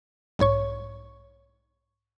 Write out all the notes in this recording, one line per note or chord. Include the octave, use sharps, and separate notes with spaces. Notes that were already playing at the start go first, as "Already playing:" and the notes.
B1 G#2 C#5 C#6